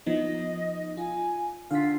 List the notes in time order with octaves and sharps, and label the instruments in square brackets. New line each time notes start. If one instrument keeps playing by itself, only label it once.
[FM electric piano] F3 B3 D#4 [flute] D#5
[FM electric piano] F4 [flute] G#5
[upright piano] D3 [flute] F4 [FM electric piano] F5 B6